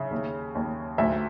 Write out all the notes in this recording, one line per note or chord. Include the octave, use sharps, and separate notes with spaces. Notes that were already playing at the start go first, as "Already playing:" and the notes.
Already playing: C#3 E5
D#2
D#2
D2 E5